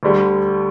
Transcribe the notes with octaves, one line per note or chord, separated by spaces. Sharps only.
D2 D3 G3